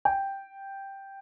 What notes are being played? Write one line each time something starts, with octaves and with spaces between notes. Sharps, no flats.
G5